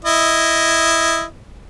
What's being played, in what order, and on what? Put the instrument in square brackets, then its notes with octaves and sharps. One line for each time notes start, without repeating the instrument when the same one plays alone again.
[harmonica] E4 D#5